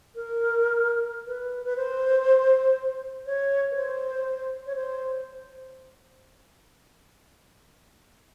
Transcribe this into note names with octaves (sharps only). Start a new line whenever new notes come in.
A#4
B4
B4
C5
C#5
B4
C5
C#5
C5